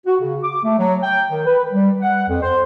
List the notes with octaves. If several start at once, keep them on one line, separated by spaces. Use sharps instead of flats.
F#4
C#3
D6
A3
F#3
G5
D#3
B4
G3
F#5
F2
C5